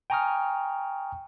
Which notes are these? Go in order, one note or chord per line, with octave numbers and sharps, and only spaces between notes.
G5 G#5 A#5 C#6 D#6 F6